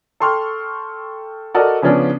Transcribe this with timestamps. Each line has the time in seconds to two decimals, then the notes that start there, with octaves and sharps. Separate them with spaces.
0.20 A4 G5 C6 C#6 F6
1.54 F#4 A4 A#4 D5 D#5
1.82 C#3 F3 B3 C#4 D4